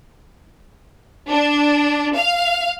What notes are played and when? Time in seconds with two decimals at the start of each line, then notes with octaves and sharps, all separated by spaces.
1.31 D4
2.16 F5